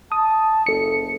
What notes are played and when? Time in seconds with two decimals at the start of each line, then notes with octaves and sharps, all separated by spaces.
0.12 A5 D#6
0.66 F#1 A4 C#7